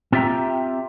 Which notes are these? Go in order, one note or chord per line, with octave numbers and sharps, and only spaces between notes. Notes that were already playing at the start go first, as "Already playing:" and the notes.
C4 F4 G4 E5 G5 A#5